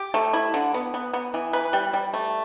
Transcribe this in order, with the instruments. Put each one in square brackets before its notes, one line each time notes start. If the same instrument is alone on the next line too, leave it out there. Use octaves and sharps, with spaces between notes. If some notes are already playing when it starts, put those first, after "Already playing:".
Already playing: [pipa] G4
A3
E4
D3
B3
B3
B3
E3
B4
G3
G3
A3